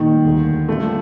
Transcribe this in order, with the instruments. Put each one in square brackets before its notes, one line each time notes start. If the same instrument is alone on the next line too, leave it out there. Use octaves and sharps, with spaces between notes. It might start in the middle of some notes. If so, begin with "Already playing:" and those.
Already playing: [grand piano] A#2 G3 A#3 D#4 [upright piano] D#3
[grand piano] D#2 D3 A3
[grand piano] A2 G3 D4 F4 [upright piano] A3